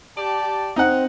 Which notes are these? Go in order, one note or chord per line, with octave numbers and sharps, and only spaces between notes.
G4 D5 A5
C4 D#4 F#5